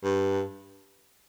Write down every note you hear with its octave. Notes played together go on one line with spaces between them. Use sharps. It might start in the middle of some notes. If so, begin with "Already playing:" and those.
G2